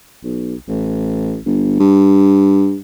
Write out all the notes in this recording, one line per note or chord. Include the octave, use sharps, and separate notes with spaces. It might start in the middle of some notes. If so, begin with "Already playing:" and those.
B1
A1
G1
G2